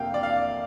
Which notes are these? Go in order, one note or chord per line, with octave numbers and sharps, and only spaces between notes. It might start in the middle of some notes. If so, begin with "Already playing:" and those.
Already playing: F2 C3 A#3 F5 G5
D5
F5